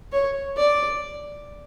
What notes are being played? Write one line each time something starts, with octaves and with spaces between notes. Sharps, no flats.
C#5
D5